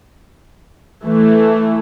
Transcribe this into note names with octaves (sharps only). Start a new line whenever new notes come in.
E3 A3